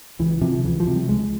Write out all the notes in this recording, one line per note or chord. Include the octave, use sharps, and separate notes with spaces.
C#2 E3
C3 F3
C#2 E3
F3
C3
G3
C#2 G#3